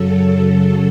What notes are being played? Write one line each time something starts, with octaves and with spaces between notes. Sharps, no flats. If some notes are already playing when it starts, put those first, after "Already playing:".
Already playing: F#2 C#3 F#3 A4